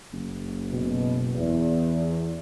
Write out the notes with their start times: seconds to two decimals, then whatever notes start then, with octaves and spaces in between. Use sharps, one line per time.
0.13 F#1
0.73 B2
1.35 E2